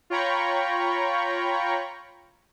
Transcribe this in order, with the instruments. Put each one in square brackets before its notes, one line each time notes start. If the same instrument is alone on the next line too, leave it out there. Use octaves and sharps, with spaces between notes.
[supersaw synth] F4 C#5 G5 A#5 B5 C#6